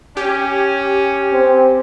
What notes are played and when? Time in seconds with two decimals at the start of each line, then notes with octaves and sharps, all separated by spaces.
0.17 C#4 G4
1.33 C4